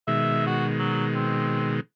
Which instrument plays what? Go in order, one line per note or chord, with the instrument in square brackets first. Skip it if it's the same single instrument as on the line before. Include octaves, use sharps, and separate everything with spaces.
[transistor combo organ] B2 D#3 G#3 [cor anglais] E5
[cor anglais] F#4
F#3
C4